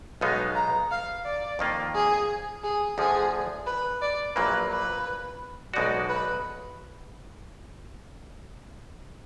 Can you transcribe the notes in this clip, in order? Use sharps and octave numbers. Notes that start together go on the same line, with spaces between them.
B1 B2 G#3 B3 D#4 F5
A#5
F5
D5
F2 D#3 A#3 F4
G#4
G#4
D2 D3 F3 G#4
B4
D5
A#1 A#2 F#3 A#3 B4
B4
B1 B2 G#3 D#4 F#4 D5
B4